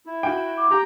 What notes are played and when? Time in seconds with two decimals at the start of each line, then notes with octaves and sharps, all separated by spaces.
0.06 E4
0.23 F#4 G5
0.57 D6
0.71 G4 G5 A#5